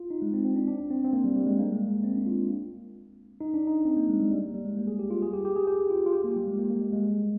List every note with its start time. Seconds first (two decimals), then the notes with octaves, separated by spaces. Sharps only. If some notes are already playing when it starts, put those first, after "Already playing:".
Already playing: F4
0.11 D#4
0.22 G#3
0.33 C4
0.44 C4
0.56 D4
0.68 D4
0.90 C4
1.04 C4
1.13 A#3
1.24 G3
1.36 G3
1.47 G#3
1.59 A#3
1.73 G#3
1.88 G#3
2.04 C4
2.15 D4
2.26 F4
3.41 D#4
3.54 D4
3.67 D#4
3.85 C4
3.97 A#3
4.09 G#3
4.20 G3
4.31 G3
4.43 A#3
4.54 G3
4.65 G#3
4.77 A#3
4.87 G#4
4.99 G4
5.11 F4
5.22 G#4
5.34 G4
5.45 G4
5.56 G#4
5.67 G4
5.90 F4
6.06 F4
6.13 G4
6.24 A#3
6.36 G3
6.47 G#3
6.59 A#3
6.70 A#3
6.81 G#3
6.93 G#3